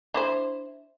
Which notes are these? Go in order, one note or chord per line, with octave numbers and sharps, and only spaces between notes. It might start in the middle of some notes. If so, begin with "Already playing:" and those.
D4 E4 C5